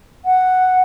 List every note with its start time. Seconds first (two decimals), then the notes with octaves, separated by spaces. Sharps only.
0.25 F#5